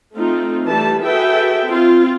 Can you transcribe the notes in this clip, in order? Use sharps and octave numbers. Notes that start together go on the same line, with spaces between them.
A3 C4 D#4 F4
E3 G3 A3 G4 B4 A5
F#4 G#4 A4 B4 E5 G5
C4 F4